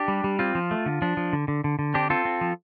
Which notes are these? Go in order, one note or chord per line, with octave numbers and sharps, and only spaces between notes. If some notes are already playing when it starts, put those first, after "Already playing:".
Already playing: D4 G4
G3
G3
C4 F4
F3
A3
D3
F3 D4
F3
D3
D3
D3
D3
C4 D4 G4
C4 F4 A4
C4
F3